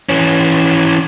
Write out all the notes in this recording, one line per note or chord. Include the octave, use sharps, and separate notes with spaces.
E3 C#4